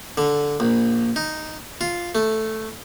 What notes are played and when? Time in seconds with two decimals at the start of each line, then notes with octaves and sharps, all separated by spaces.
0.18 D3
0.60 A#1
1.16 D#4
1.81 F4
2.15 A3